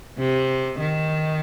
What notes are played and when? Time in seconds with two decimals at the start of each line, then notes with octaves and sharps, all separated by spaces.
0.18 C3
0.80 D#3